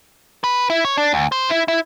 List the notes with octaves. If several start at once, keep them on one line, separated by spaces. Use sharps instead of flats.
B4
E4
C#5
D4
D2
C5
E4
E4